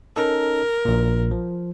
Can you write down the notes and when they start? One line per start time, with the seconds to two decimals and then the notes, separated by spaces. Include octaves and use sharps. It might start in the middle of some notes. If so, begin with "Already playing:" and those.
0.16 C#4 D#4 A4 A#4
0.85 A#1 A#2
1.31 F3